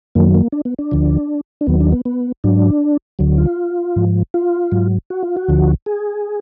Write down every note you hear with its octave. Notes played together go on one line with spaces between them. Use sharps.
F#2 D#3 F#3 A#3
A#3
D4
B3
D4
D2 D3 F3
D4
D#2 D#3 F#3 B3
D4
B3
B3
G#2 F#3 D4
D2 D3 F#3
F4
G#2 F3
F4
G#2 F#3
F#4
F4
F#4
D2 D3 F3
G#4